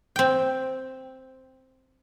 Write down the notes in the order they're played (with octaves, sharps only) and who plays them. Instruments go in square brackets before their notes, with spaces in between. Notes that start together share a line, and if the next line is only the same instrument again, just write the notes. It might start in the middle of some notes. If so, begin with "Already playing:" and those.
[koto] C4 G5